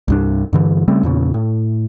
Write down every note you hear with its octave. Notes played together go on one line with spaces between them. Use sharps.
C2 G2 D4
G2 D3 E3
C#3 G3 A3 C4
E2 A#2 C#3
A2